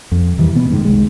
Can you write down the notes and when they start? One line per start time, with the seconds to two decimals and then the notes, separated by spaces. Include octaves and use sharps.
0.12 F2
0.38 E2 D#3 E3 G3
0.55 B2 B3
0.70 F1 G#2 D#3
0.85 C2 G#3